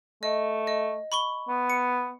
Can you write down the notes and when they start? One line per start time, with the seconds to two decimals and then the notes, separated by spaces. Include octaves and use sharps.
0.23 A3 D#5
0.67 D#5
1.12 B5 C#6 G7
1.48 B3
1.70 C#7